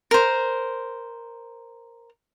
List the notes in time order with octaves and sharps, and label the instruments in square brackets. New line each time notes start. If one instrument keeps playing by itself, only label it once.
[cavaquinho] A#4 C5